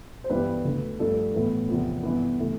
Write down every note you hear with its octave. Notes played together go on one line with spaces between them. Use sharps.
C5
G2 E3 G3 B3 B4
D2 D3 A3
G2 F3 A3 A4
A2 E3 B3
E2 C3 F3 B3
G2 E3 B3
C3 E3 A3